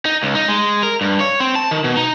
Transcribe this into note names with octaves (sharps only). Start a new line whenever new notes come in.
D#4
C#2
D#4
G#3
A#4
G2
C#5
C4
A5
D#3
B2
D#4